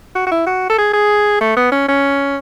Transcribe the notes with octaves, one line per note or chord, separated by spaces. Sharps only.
F#4
F#4
E4
F#4
A4
G#4
G#4
A3
B3
C#4
C#4